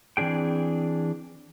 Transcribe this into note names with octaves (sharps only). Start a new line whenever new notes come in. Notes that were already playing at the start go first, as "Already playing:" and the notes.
E3 C4 D4 G#4 G5